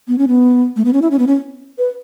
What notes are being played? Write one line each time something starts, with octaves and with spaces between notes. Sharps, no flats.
B3
C#4
B3
A3
B3
C#4
E4
C#4
B3
C#4
B4